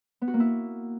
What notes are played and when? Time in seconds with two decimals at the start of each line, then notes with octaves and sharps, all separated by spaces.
0.21 B3
0.28 F#4
0.34 A#3
0.40 E4